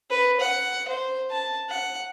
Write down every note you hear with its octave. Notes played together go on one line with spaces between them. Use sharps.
B4
F#5
C5
A5
F#5